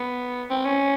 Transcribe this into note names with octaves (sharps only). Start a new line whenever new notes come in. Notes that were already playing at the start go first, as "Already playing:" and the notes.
Already playing: B3
C4
C#4